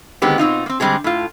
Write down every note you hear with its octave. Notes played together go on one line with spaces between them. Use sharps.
D3 D#3 G#3 B3 C4 G4
B2 C4 D#4 F4
A#3 C4
D3 G3 G#3 C4 G#4
A2 F4